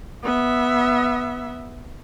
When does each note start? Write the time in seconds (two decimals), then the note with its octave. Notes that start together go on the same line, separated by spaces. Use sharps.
0.23 B3 E5